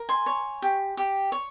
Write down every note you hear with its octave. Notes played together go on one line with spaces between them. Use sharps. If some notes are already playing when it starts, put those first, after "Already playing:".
Already playing: A#4
G#5 C6
C#5
G4
G4
C#5